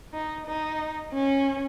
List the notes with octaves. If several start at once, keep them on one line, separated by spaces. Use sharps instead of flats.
D#4
D#4
C#4